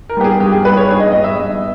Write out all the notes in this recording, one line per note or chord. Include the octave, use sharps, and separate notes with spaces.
A#4
G3 B3 G4
G#4
G2 G4
G#4
G3 B3 B4
C#5
G2 G#4
D#5
G3 B3 D#5
E5
G2